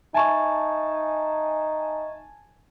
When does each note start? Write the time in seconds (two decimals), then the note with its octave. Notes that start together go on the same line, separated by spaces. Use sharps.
0.14 D#4 E5 G#5 A5 C#6